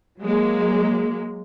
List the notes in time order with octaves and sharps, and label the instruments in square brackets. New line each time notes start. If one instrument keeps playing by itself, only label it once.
[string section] F#3 G#3 A#3